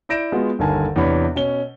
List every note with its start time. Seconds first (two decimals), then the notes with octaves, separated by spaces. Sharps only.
0.09 E4 D5 G6 A#6 D7 E7
0.32 G#3 B3 F4 F#4
0.59 G1 D#2 D3 A#4 G#5 A5
0.96 E2 C3 B3 D4 C#5 B5
1.35 B2 C#4 G7